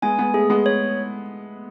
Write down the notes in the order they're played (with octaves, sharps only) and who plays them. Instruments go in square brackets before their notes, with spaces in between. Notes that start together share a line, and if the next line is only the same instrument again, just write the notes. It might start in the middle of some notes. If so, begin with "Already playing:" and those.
[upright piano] G#3 B3 [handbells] G#5
[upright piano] G#3 B3
[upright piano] A3 [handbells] G#4
[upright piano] G#3 B3
[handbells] C#5